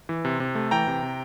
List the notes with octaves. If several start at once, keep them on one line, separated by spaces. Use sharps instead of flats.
E3
C3
C3
A3
E3 G5 A#5
C3
C3